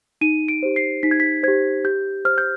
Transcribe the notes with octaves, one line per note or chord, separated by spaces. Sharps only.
D#4 D#7
D7
G4 C5
C7
D#4 B6
G#6
B6
G4 C5 G#6
G4 G6
C5 F6
G6